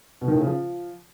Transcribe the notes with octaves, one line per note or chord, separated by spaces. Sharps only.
B2
D#3
A2
C#3
F3